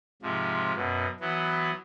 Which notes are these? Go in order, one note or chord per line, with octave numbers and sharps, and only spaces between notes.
G#2 C3 F3
F#2 B2
E3 F#3 B3